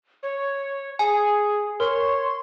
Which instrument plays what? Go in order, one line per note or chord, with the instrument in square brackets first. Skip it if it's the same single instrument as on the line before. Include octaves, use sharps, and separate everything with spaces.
[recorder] C#5
[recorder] G#4 [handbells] G#5
[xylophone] A#4 [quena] C#5 [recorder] C6